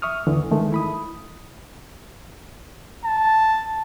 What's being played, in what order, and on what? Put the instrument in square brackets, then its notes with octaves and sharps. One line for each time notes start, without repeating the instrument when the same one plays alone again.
[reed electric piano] E5 C#6 D#6 F6
D#2 D3 E3
D#3 E3 G#3 A3
E4 B5 D#6
[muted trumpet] A5